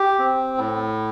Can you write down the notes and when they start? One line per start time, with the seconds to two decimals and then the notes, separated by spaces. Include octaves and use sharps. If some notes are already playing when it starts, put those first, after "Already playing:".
Already playing: G4
0.19 C4
0.58 A2